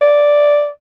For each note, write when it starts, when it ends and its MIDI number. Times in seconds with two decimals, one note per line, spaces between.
0.01 0.68 74